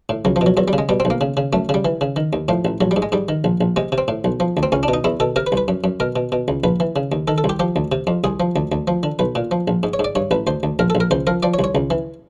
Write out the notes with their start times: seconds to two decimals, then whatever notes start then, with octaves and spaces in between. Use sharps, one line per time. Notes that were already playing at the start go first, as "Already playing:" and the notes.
0.09 A2
0.25 C#2 F#3
0.36 F3
0.41 B2
0.46 F#3
0.57 E2 F#3
0.68 G3
0.73 C#3
0.78 G#3
0.89 B2 G3
1.00 C4
1.05 B1
1.10 A#3
1.21 C#3
1.37 C#3
1.53 F#2 A3
1.69 C#3 G3
1.85 E3
2.01 C#3
2.16 D#3
2.33 D#2
2.48 A2 F3
2.65 A1
2.81 A#1 F#3
2.91 G3
2.96 G#2
3.02 G#3
3.12 G#2 G3
3.29 D#3
3.44 A#1
3.61 A#1
3.76 C3 G#3
3.92 C3
3.98 C4
4.08 A2
4.24 B1
4.40 F3
4.57 D2
4.63 C4
4.72 C#2 C#4
4.83 D4
4.88 B2
4.94 D#4
5.04 E2 E4
5.20 B2 A4
5.36 C3 A#4
5.47 B4
5.52 C2
5.57 B4
5.68 F#2
5.84 F#2
6.00 B2 A#4
6.16 B2
6.32 B2
6.48 C#2
6.64 A#1 B4
6.80 E3
6.96 C#3
7.12 D#2
7.28 D#3 A4
7.38 A4
7.44 C2
7.49 G4
7.60 F3 G4
7.76 D2
7.92 C3
8.07 F2
8.24 C2 G#4
8.40 F3
8.56 D2
8.72 D2
8.88 F3
9.03 D3
9.19 B1 B4
9.35 A#2
9.51 F3
9.68 A#1
9.83 G#2
9.94 C#5
9.99 G#2
10.04 D5
10.15 G2 C#5
10.31 A1 B4
10.47 D2 C5
10.63 D2
10.79 A#1 A#4
10.90 A#1 A4
11.00 A#4
11.11 C#2 C5
11.27 F3 A#4
11.43 F3 D5
11.54 C#5
11.59 C2
11.64 C#5
11.75 C#2
11.90 E3